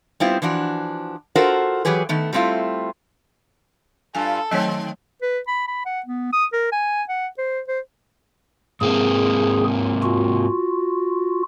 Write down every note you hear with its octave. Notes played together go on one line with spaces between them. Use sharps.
G3 B3 C4 E4 F4
E3 F3 D4 F#4
F4 F#4 A4 A#4 C5
E3 F#3 G4 G#4 B4
D#3 A3 B3
G3 A3 C4 E4 F4
G2 F4 A4 G#5
D#3 F#3 A3 C4 C#5
B4
B5
B5
F#5
B3
D#6
A#4
G#5
F#5
C5
C5
G#2 A#3 C4 G#4
F4 F#4